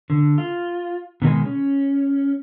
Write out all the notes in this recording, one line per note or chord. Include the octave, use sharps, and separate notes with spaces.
D3
F4
B2 D#3 F#3 G#3
C#4